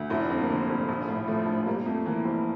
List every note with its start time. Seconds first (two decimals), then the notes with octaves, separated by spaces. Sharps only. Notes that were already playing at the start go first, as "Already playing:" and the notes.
Already playing: D2
0.10 F1 E4
0.20 D4
0.30 F2 C4
0.40 A#3
0.50 D3
0.69 F1
0.89 A#1
1.08 A2
1.28 F3 A3
1.46 A#1
1.66 G3 A#3
1.86 F2 A3
2.05 E3 A#3
2.25 F1 C4